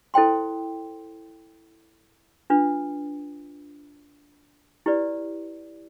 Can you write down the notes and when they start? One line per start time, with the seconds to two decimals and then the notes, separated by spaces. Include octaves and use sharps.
0.14 E4 A4 C5 G5 C6
2.50 D4 F4 B4
4.86 E4 G4 B4 D5